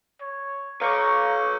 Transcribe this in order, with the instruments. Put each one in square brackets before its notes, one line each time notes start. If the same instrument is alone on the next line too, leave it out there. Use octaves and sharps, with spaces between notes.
[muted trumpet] C#5
[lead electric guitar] B4 C#5 [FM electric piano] F5 C#6 D6 [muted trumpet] A#5